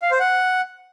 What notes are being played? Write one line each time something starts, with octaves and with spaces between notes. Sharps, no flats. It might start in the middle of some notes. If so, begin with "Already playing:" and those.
F5
C5
F#5